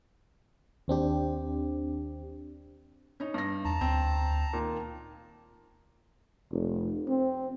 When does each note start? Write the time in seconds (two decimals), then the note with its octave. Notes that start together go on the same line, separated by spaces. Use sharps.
0.88 D#2 C4 D4 G4
3.20 C#4 D#4
3.34 G2 A#6
3.65 E2 A5 A#5
3.81 D2 C4
4.53 A#2 D#3
6.51 F1
7.08 C4